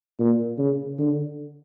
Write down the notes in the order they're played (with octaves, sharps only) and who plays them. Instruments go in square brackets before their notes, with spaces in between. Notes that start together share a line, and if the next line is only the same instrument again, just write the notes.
[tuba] A#2
C#3
D3